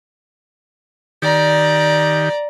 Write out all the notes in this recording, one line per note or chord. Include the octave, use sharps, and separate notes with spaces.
D#3 G4 D5 A#5